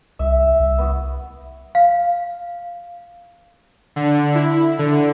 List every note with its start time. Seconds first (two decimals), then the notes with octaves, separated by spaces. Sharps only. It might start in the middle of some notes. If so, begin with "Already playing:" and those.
0.19 C2 E5
0.60 C2
0.78 B3 F#4
1.75 F5
3.96 D3
4.35 E4
4.79 D3